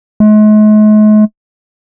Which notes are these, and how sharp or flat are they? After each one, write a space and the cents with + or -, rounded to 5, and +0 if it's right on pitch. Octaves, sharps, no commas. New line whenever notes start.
G#3 +45